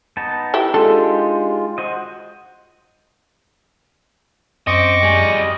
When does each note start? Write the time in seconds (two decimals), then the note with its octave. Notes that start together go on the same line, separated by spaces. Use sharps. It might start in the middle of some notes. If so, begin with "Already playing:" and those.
0.17 B3 D#4 A5
0.54 E4 G4
0.74 G#3 D4 D#4 F4 G4 A4
1.78 F#4 C5 D#5
4.67 F#2 C4 D#5 C#6 D6
5.03 G3 G#4